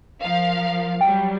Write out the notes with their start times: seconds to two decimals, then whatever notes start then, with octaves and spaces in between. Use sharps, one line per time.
0.21 F3 A#4 F5
1.01 F#3 G3 G5